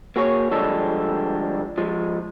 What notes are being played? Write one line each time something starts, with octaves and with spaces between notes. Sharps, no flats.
A#3 F#4 G#4 C#5
D3 F3 G3 G#3 G4 A4
F3 G#3